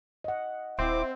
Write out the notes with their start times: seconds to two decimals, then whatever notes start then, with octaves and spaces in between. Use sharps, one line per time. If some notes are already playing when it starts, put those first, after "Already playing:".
0.24 D#5 F#5
0.79 D#1 C4 E4 D6